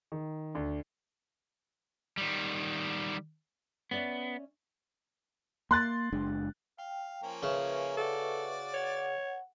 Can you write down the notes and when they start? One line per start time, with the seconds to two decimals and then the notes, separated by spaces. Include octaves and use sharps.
0.12 D#3
0.55 D2
2.17 D#3 G3
3.91 B3 C#4 D5 E5
5.71 A#3 C6 F#6 A6
6.13 F#1 G#3 D4
6.79 F5 G5
7.23 F3 A#3 C#4
7.43 C#3 B4 E5 C#6
7.97 F#4 A4 D5
8.74 C#5 F#5